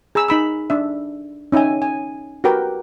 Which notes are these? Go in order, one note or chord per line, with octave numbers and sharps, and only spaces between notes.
G#4 A#5 B5 E6
D#4 B5 E6
D4 E5
C#4 D#4 E5 G5 G#5
G#5
F#4 G4 A#4 B4 G5